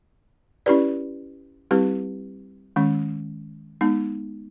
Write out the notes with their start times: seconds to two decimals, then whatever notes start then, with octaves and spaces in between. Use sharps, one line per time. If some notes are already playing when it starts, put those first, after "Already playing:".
0.66 C#4 E4 G4 B4 D5
1.71 G3 C4 E4 G4 B4
2.76 D#3 G#3 C#4
3.81 G#3 B3 D#4